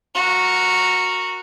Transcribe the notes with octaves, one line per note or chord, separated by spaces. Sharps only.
F#4 A#4